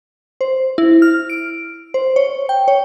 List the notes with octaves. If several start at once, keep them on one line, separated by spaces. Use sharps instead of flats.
C5
E4
F6
D7
C5
C#5
G5
C#5